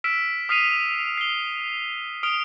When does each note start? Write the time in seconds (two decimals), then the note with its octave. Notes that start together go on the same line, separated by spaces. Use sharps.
0.04 E6 F6 B6 D7 E7
0.49 D#6 F6 B6 C7 D#7 F7
1.18 C7 G7
2.23 D#6 F6 D7 F7 G7